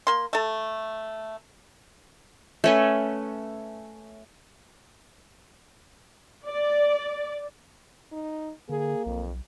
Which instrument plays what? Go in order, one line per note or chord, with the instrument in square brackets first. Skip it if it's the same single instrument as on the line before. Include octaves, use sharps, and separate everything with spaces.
[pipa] A#3 C6
A3 A4
[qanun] A3 C#4 B4
[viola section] D5
[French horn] D#4
[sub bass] D3 [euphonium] A#3 [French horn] G#4
[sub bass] B1 [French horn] F2